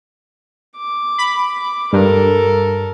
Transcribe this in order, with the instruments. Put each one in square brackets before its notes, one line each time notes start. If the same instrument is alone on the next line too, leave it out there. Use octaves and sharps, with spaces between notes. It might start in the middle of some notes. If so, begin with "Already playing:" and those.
[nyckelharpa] D6
[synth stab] B5
[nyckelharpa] D6
[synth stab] G2 [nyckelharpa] A4 A#4